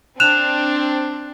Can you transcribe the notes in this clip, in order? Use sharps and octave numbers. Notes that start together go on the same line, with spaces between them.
C4 D4 F#6 E7 F7